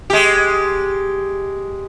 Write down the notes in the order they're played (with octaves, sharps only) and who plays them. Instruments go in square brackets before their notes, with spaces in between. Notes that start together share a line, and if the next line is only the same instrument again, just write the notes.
[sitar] G#3 G4